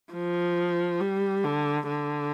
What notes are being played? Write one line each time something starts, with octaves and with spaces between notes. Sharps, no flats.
F3
G3
D3
D3